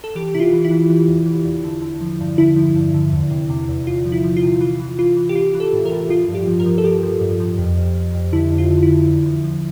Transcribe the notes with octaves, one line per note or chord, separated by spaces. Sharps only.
A4
E3 G4
C3 E4
F4
E3
E4
E3
E3
E2
E3
E2
D3
D3
F3
G2
D3 E4
F3
G2
D3
E2
C3
C3
E2
E2 F4
F3
E4
F3
F4
C3
E3 F4
E3
E3 F4
E3
G4
E3 F4
E3
A4
A2
A#4
A2
F3 F4
G2
G4
F3
A#4
F3
A4
F3 G4
F3
G2
F3
F2
F2
F2
F2
D3 E4
F2
F4
D3
E4
D3
E2
F3
F3